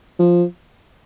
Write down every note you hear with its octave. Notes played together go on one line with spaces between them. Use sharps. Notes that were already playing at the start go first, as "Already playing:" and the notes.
F3